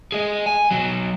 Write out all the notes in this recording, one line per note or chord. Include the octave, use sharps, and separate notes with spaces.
G#4 D#5
G#5
B2 F#3